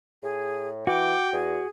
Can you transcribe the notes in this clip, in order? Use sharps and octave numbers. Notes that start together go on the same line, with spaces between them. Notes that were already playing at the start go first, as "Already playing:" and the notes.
A2 G#4
E3 F#4 G5 D6
E2 G#4